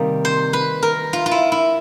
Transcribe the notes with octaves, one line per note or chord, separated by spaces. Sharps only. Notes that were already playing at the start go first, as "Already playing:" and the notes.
Already playing: C3 D#3 G3 A#3
C5
B4
A#4
F4
F4
E4
E4